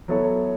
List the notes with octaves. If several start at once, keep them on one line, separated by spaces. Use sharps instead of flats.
F#3 B3 E4 A4 C#5